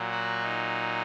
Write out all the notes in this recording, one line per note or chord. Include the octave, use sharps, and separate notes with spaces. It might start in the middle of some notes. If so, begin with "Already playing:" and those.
Already playing: A#2 F#3
F#4
D#4